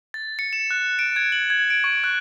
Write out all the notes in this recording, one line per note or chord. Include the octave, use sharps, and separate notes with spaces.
A6
C#7
E7
F#6
D7
G#6
F#7
G#6
D7
C#6
F#6